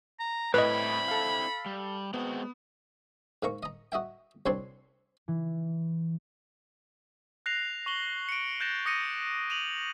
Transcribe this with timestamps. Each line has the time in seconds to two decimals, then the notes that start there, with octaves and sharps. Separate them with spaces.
0.20 A#5
0.54 A2 C4 D4 E4 B4 D#5 B5
1.08 A4 F5
1.66 G3
2.14 G#3 B3 C4 F#4
3.43 G#2 A#3 A#5 C#6
3.63 D#5 A#5
3.92 F#4 D#5 E5 G5
4.46 C2 C4 D4 C#5 D5 C6
5.28 E3
7.46 F#6 A#6 C7 F7
7.86 C#6 F#7 G7
8.29 C#7 D7
8.60 F#6 G6 A6 A#6 E7
8.85 D6 D#6 A#6 C#7 D#7
9.50 D#7 F7 F#7